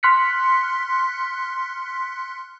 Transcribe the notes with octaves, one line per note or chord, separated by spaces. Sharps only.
C6 F6 F#6 B6 C#7